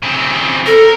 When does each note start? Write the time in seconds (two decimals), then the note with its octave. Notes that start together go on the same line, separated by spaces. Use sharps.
0.03 C#3 C4
0.66 A4 A#4